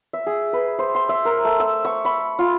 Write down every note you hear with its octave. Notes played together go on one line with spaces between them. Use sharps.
E5
G#4
B4
C5
C6
E5
A#4
A3
E6
C#6
B5
F4